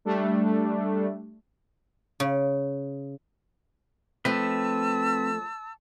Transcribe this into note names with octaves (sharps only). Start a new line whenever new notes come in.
G3 A3 D4
C#3
F3 A3 C4 B4 A5 D6 E6